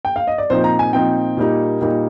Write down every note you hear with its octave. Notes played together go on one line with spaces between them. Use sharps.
G5
F5
D#5
D5
A#2 F3 C4 D#4 C5
A#5
G#5
A#2 F3 C4 D#4 G5
A#2 G3 A#3 D#4
A#2 G3 A#3 D#4